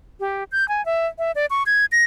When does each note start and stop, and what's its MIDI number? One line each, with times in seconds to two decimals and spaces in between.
0.20 0.44 67
0.52 0.67 91
0.69 0.84 80
0.86 1.07 76
1.19 1.32 76
1.35 1.46 74
1.50 1.63 85
1.66 1.85 92
1.92 2.04 94